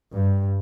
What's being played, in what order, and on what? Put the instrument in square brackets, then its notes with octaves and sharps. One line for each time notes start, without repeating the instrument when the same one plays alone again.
[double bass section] G2